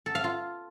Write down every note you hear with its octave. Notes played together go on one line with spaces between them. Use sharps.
A4
F5
F4